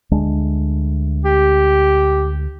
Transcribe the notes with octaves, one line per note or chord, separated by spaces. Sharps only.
D2 G#3 D4
G4